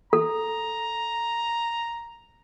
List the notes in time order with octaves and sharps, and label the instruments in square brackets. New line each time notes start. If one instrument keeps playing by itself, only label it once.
[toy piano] A4 [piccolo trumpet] A#5